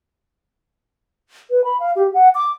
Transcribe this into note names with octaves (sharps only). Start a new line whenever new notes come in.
B4
B5
F5
G4
F#5
D6